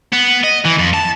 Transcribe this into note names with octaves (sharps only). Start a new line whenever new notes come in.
B3
D#5
E3
F2
A5